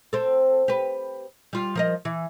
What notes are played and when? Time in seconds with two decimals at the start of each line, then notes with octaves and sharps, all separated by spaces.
0.13 C4 A4
0.68 G4 B4
1.53 G3 F4
1.75 F3 A#4 D#5
2.05 E3